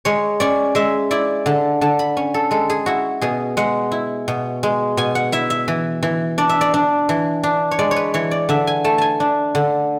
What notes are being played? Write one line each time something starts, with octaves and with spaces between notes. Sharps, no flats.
G#3 C#5
C#4 D5
G#3 E5
E4 D5
D3 A5
D3 A5
B5
C#4
A4
G#3 A4
G#4
E4 F#4
B2 G#4
G#3 F#5
E4
B2
G#3
B2 G#5
F#5
E4 E5
E5
E3
E3
D4 D5
E5
D5
D4
E3
D4
C#5
G#3 D5
C#5
B4
E3 C#5
D5
D3 E5
G#5
A3 A5
G#5 A5
D4
D3